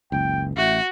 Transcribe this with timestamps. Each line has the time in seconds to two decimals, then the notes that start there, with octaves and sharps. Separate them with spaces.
0.12 F#1 C#2 G5
0.57 A1 A3 F#4